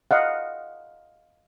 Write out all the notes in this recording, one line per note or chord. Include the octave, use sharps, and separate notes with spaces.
D#5 F5 F#5